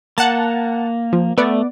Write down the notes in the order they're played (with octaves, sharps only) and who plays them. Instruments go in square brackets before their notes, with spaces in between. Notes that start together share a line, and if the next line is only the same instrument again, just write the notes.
[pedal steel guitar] A#3 [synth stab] F#5 A5
[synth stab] F3
[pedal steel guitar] A3 [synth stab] B3 D5